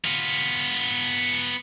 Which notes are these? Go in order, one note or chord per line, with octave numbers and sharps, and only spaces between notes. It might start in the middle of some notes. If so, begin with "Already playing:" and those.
B3 F4